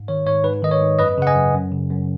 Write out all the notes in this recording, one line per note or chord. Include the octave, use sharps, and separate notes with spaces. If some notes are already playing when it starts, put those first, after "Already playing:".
Already playing: G#2
D#3 C#5
G#2 C#5
G#2 B4
D#3 D#5
C#5
G#2
F#2 B4 D#5
C#3 F#5
D#5 G#5
F#2
F#2
C#3
F#2